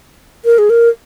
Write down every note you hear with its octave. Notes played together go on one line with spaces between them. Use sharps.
A#4
G#4
A#4